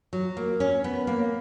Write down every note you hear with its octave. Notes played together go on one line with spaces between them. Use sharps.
F#3
A#3
C#4
B3
A#3